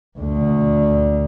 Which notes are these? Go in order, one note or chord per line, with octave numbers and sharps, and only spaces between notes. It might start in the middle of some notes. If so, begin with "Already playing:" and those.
D2 D3